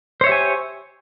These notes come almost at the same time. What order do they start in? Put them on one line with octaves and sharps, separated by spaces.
C5 C#5 E5 G4 G#5